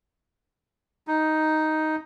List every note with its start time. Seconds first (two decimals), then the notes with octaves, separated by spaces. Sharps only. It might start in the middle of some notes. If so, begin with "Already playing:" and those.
1.07 D#4